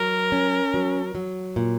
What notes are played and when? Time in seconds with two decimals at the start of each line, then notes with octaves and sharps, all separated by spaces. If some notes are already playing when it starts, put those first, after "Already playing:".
Already playing: F#3 A#4
0.32 C#4
0.74 F#3
1.15 F#3
1.56 A#2